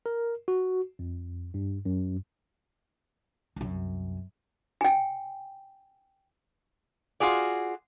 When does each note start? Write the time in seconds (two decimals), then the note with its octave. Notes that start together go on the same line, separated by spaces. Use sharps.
0.06 A#4
0.48 F#4
0.99 F2
1.54 G2
1.85 F#2
3.56 C2 F#2
4.81 G5 G#5
7.20 F4 F#4 G#4 D5